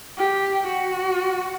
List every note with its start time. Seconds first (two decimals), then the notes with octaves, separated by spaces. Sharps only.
0.18 G4
0.66 F#4